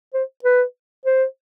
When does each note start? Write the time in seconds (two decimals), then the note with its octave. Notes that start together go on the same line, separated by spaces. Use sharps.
0.14 C5
0.44 B4
1.05 C5